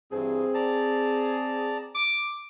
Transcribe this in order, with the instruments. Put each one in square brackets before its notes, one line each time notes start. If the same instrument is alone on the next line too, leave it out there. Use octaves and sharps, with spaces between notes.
[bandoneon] G2 E3 [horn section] C4 G#4
[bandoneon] D5 A5 A#5
[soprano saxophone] D6